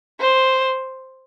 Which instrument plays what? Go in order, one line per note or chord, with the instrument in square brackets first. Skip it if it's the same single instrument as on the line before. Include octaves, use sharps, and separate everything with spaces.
[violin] C5